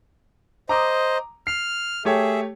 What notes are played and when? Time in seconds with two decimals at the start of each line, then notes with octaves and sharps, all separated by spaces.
0.69 C5 D#5 A#5 D6 D#6
1.47 F6 C7
2.05 A3 G4 G#4 C#5 E5